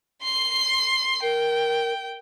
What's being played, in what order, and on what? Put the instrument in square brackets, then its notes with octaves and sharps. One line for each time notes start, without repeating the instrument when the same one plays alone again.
[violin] C6 C7
[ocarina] A#4 [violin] G5